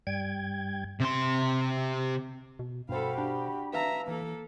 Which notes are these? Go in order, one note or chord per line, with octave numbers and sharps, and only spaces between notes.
G2 G3 G5 G#6
C3 C6
B2
G2 B2 F#4 A4 C5 F5 G5 B5
D4 G4
B4 E5 F5 A5 A#5
E3 A#3 A4